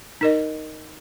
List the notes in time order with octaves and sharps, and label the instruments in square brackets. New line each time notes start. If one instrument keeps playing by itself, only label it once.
[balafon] D#4 A#4 D#5